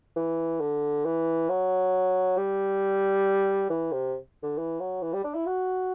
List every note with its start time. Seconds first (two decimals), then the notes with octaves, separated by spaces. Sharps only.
0.16 E3
0.61 D3
1.05 E3
1.49 F#3
2.37 G3
3.70 E3
3.92 C3
4.43 D3
4.58 E3
4.80 F#3
5.02 E3
5.13 G3
5.24 D4
5.35 E4
5.46 F#4